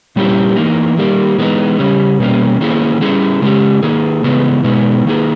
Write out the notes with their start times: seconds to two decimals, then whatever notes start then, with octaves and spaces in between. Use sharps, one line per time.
0.16 A#2 G3 C#4 E4 G4
0.56 E3 A#3 D#4
0.97 D#3 G3 A#3
1.38 E3 G#3 B3 D#4
1.79 C#3 G3 C#4
2.19 B2 G3 A#3 C#4
2.61 D#3 A#3 C#4 E4 G#4
3.01 G3 C#4 E4 G#4
3.42 C#3 G#3 C#4 G4
3.83 D#3 A#3 D#4 G#4
4.24 C#3 E3 G#3 B3
4.64 B2 G#3 B3 D#4
5.05 D#3 A#3 D#4 G#4